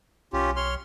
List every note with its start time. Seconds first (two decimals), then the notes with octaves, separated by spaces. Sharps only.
0.33 B1 C#4 F4 G4
0.56 C#5 C6 F6